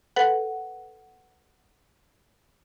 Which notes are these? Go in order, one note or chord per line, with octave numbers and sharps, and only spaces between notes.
A4 B4 F#5